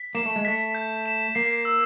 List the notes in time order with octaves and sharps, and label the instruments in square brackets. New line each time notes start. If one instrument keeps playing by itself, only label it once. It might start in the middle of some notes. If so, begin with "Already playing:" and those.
Already playing: [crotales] B6
[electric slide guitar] A#3 [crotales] E7
[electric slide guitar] A3
G#3
[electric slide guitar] A3 [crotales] B6
[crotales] G6
E7
[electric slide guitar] A#3 [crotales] C7
[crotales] E6